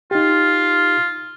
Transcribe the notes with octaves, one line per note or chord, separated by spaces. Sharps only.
D#4 F4 G4